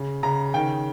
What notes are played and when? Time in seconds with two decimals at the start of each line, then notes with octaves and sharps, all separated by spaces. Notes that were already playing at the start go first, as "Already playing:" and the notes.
Already playing: C#3
0.23 C#3 A#5
0.54 D#3 G5